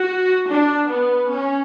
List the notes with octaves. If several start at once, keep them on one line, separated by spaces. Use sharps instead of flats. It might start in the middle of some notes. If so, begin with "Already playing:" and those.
Already playing: F#4
D4
B3
C#4